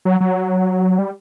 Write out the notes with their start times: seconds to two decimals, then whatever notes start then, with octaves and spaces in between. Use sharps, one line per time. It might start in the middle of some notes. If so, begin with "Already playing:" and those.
0.05 F#3
0.20 F#3
0.99 G3